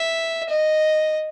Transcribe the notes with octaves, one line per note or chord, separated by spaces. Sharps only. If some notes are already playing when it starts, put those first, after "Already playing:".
Already playing: E5
D#5